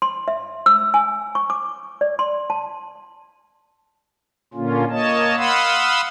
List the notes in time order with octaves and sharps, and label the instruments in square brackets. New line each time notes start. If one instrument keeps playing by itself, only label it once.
[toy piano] C6
E5
E6
G#5
C#6
D6
D5
C6
A5
[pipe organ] A#2 D3 A#3 C#4 F4
A#3 C#5 D#5 A5
F5 F#5 B5 C6 D#6 E6